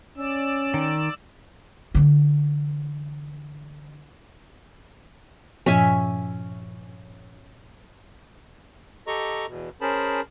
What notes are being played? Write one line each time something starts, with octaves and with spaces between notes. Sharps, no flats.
C#4 D5 E6
D#3
D3 E3
G2 A#2 F3 C#4 E5 G#5
G4 A4 D#5 A#5 C#6
E2 B2
C#4 G#4 A#4 C5 A5 B5